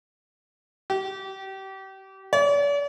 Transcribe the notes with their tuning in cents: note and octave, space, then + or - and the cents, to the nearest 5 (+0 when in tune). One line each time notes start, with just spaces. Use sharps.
G4 -30
D5 -45